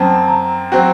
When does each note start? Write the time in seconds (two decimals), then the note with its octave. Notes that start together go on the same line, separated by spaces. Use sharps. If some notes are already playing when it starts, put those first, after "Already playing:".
Already playing: F#2 F#3 C4 A5
0.28 A#5
0.72 F#3 C4 F#4